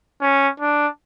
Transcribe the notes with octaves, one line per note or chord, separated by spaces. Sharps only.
C#4
D4